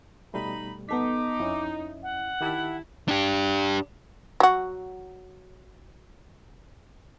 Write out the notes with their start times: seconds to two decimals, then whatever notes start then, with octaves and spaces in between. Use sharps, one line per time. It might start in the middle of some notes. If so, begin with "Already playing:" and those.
0.34 B2 G3 A3 D#4 B5
0.89 B3 D#4 A4 D6 B6
1.40 F2 C#4 E4 D#5
2.03 F#5
2.41 D#3 E4 G4 A5
3.08 D4 G4
4.40 F#3 F#4